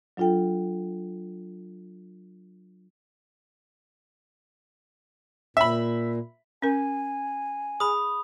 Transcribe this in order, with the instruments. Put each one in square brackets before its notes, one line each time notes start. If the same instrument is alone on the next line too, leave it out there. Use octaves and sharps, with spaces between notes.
[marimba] F#3 D4 F4 A4 G5
[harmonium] A#2 [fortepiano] E5 B5
[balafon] C#4 A#4 [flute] G#5
[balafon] G#4 [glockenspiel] B5 D#6